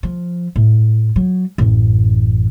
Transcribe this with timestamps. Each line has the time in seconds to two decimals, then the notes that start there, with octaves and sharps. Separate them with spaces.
0.03 F3
0.56 A2
1.16 F#3
1.58 A1 F#2